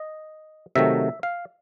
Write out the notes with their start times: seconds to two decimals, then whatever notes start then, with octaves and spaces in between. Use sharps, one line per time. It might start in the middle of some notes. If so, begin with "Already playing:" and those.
Already playing: D#5
0.75 C3 D#3 F#3 A3 E5
1.23 F5